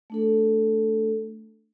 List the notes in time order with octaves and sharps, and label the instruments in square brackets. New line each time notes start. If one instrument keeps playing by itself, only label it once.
[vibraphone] A3 D4 A4